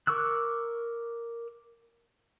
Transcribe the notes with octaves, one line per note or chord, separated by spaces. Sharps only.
A#4 C#6 D6 E6 F#6